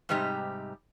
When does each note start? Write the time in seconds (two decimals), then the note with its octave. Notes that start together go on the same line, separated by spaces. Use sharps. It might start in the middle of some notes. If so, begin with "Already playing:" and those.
0.09 G#2 C3 G3 D#4 G4